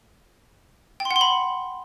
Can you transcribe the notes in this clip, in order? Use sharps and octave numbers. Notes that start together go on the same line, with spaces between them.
G5
C6
F#5
C6
B5